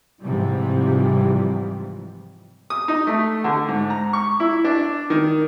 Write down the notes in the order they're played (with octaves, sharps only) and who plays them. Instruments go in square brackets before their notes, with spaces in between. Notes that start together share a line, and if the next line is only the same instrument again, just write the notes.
[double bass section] G#2 C3 E3 F3 G3
[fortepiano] D#6
D#4
A3
D3
G#2
A#5
C#6
E4
D4
D#3